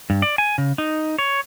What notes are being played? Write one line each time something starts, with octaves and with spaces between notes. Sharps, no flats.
G2
D5
G#5
C#3
D#4
C#5